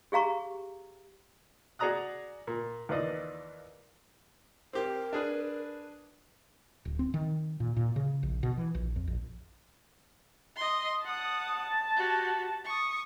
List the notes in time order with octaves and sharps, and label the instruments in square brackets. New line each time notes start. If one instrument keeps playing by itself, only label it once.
[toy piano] G4 G#4 F5 A#5 C#6
[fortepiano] F#4 G#4 D5 A#5 D#6 F#6
A#2
D#2 E3 F4 D5 D#5
[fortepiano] C4 G4 [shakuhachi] A#4
[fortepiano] D4 G#4 B4
[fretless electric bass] D1
C4
D#3
A#2
A#2
C#3
A#1
B2
E3
A#1
F2
A#1
[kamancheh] D#5 C6
[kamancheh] F#5 D#6 [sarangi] A5
[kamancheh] F#4 G4
C#6 D#6